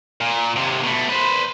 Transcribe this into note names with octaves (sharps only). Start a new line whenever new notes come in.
A#2
D#2 C3
B2 A3
B4 C5